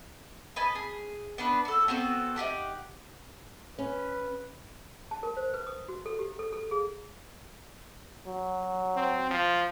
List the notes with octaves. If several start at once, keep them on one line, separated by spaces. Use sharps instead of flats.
B4 D#5 G#5 A5
G#4
B3 D4 B4
F#4 A4
B3 C4 F#4 A4
D#4 F4 G4 F#5
C#4 B4
A5
A#4
C5
B4
D#6
F#4
A4
G4
A4
A4
G#4
F#3
C4
F3